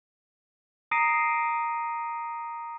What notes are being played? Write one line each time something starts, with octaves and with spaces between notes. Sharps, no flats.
A#5 D#6 A#6 C7 D7 D#7